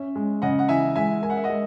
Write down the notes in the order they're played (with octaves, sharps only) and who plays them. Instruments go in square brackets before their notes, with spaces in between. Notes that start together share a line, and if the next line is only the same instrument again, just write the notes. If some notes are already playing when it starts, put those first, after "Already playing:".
Already playing: [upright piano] C#4 [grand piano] E5
[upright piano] G#3
[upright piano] C#3 [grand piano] D#5 F#5
[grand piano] F#5
[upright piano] E3 [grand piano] E5 G#5
[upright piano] G#3 [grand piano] E5 G#5
[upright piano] A#4 [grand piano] G#5
[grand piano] F#5
E5
D#5 F#5
[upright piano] G#3